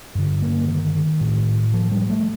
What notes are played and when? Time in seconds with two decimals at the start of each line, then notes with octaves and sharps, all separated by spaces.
0.15 G2 D3
0.42 A#3
0.68 D#3
1.21 A2
1.73 F3
1.92 G3
2.10 A3